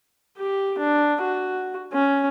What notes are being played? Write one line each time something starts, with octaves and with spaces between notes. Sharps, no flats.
G4
D4
F#4
C#4